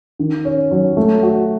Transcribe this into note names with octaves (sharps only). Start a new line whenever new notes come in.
D#3
C#4
F#3
A3
F#4